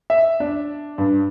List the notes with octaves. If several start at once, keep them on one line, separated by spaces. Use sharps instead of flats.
E5
D4
G2